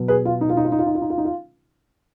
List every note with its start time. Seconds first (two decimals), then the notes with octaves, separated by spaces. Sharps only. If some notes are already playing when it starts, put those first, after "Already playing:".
Already playing: B2 F#3
0.08 G#4 B4
0.25 F4
0.41 D#4
0.49 F4
0.57 D#4
0.65 F4
0.72 D#4
0.79 F4
0.86 D#4
0.95 F4
1.02 D#4
1.10 F4
1.18 D#4
1.25 F4